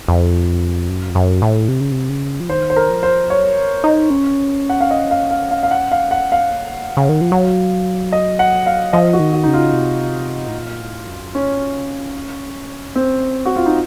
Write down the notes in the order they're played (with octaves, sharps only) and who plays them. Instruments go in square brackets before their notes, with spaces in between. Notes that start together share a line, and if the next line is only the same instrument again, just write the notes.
[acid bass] F2
F#2
F2
F#2
A2
C3
C#3
C3
C#3
F3
[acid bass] D#3 [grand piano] C5
[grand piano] C5
A#4
[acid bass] F3
[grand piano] C5
[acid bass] F#3 [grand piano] C#5
[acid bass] D#4
C#4
[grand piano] F#5
F5
D#5
F5
F5
F5
F5
F#5
F5
F#5
F5
[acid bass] A#3
C#3
D#3
F3
F#3
[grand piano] D#5
F#5
F5
[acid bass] F3 [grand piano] D#5
[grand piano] F#4
[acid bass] D#3
[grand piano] F#4
[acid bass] C#3 [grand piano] D#4
[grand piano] F4
[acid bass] C3
A2
A#2
A2
F#2
[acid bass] A2 [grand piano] C#4
[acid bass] A#2
C#3
C3
[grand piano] C4
F#4
F4
D#4